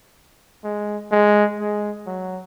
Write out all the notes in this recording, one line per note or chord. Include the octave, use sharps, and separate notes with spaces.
G#3
G#3
G#3
F#3